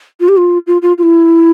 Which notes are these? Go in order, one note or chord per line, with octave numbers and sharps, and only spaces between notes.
F4
G4
F4
F4
F4
F4
E4